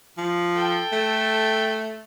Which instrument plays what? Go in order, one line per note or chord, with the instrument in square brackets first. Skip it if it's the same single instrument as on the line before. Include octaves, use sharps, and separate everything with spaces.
[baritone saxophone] F3
[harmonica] A4 G5
[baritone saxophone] A3